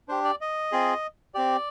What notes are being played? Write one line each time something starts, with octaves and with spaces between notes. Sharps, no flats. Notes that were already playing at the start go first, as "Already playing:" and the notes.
D4 G4 C5
D5
D#5
C4 F4 G#4
C4 G4 D5